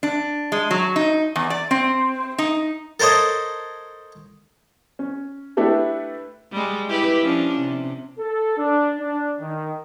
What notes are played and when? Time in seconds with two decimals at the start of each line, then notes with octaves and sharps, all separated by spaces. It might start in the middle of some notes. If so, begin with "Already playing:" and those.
0.03 D4
0.52 G#3
0.71 F#3
0.96 D#4
1.36 E2
1.50 D5
1.71 C4
2.38 D#4
3.00 A4 A#4 C5 C#5 D#5
4.99 C#4
5.57 A3 D4 E4 G4 A4 B4
6.52 G3 G#3
6.89 E4 G4 B4
7.21 F3 C#4 D4
7.59 C3
8.19 A4
8.58 D4
8.99 D4
9.40 D#3